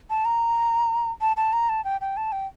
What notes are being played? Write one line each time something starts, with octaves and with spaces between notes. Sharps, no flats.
A5
A#5
A5
A5
A#5
A5
G5
G5
A5
G5